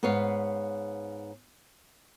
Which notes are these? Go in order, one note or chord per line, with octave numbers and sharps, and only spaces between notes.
G#2 B3 B4 C#5 F5